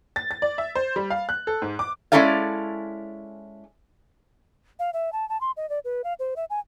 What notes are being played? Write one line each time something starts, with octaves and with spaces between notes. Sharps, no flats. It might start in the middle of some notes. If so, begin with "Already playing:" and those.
A6
A6
D5
E5
C5
G3
F5
F#6
A4
G#2
D6
G#3 C#4 E4 A4 D5 F5
F5
E5
A5
A5
C6
D#5
D5
B4
F5
C5
E5
G#5